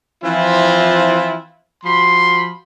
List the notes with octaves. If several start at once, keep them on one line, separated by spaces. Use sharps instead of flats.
E3 F3 C4 E4 F4
F3 F#4 B5 C6